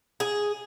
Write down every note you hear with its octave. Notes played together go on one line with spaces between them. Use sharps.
G#4